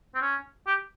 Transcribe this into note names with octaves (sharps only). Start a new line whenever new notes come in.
C4
C#4
G4